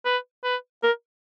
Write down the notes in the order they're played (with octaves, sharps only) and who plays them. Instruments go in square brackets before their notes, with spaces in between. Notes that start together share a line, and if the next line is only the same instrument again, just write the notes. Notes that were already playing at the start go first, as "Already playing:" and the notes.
[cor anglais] B4
B4
A#4